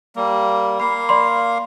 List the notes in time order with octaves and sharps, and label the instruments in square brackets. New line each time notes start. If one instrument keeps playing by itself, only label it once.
[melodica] G3 A#3
[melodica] A#3 F5 [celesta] B5
[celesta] D5 B5 C6